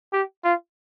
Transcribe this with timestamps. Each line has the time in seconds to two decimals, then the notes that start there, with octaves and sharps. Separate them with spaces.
0.13 G4
0.44 F4